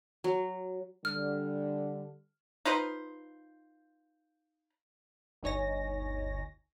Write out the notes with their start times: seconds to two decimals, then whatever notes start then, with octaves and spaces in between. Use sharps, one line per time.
0.24 F#3
1.05 D3 G3 F6
2.65 D#4 F4 B4 C5
5.43 G1 D2 D#4 C#5 G#5 A#6